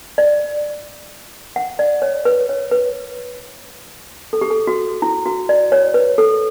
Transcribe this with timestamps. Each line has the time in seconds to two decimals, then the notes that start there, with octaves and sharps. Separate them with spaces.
0.18 D5
1.56 F#5
1.79 D5
2.02 C#5
2.25 B4
2.49 C#5
2.71 B4
4.33 A4
4.41 G4
4.50 A4
4.67 F#4
5.02 E4
5.26 F#4
5.49 D5
5.72 C#5
5.94 B4
6.18 A4